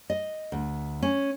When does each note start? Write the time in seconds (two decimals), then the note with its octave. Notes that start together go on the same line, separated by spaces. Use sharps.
0.10 D#5
0.52 D2
1.02 C#4